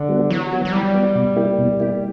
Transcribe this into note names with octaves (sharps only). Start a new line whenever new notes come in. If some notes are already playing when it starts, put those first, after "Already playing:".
Already playing: D3
G3 B3 F#4
E3 F#3
B3 F#4
F#3
E3 G3
B3 F#4
B2
A#3 E4 G4
B2
A#3 E4 G4